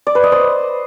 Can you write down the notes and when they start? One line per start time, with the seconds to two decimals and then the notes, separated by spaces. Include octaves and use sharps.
0.07 D5
0.15 B4
0.24 D#5
0.32 C5